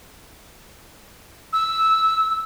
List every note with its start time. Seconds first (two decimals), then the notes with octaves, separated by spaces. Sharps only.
1.53 E6